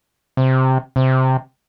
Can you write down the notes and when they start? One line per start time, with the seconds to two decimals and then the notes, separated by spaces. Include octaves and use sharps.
0.37 C3
0.96 C3